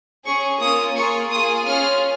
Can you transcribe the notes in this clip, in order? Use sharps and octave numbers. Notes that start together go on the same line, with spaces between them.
C#4 G#4 C#6
A#3 C#4 F4 D#6
A#3 F4 G#4 C#6
A#3 F4 G#4 D#6
C#4 F4 G#4 F6